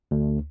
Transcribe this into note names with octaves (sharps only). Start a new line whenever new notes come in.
D2